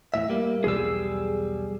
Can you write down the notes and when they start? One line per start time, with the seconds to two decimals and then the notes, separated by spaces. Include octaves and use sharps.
0.14 E2 A2 E5
0.30 G3 A#3
0.64 B1 E2 G3 G#4 E6